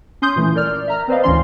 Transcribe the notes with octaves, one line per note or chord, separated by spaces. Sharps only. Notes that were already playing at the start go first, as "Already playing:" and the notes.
C#4 C6 D#6 G6
A#2 E3 A3
A#4 D5 F6
E5 A#5 F6
C4 B4 C5 D5 D#5 F5
D2 A2 E3 C#4 D5 C6